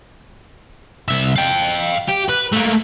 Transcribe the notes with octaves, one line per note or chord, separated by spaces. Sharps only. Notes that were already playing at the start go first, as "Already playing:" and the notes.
C2 E5
F5 G5
G4
B4
A3 A#3